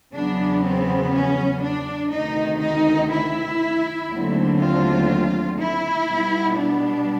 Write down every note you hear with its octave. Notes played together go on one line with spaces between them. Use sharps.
E2 C#3 F#3 B3 D4
C4
C#4
D4
D2 C3 D#3 D#4
D#4
E4
D#2 D3 F#3 A3 C4
F4
E4
B2 G3 B3
D4